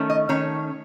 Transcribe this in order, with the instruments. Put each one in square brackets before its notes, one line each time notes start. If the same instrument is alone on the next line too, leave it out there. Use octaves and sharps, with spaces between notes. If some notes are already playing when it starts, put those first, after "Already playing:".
Already playing: [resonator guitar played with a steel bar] D#3 A3 C#4
D#5
D#3 A3 C#4 C#5